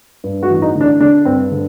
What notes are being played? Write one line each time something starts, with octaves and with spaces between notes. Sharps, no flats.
G2
F#4
A1
D#4
D3
D4
D3 D4
G2 C4
D3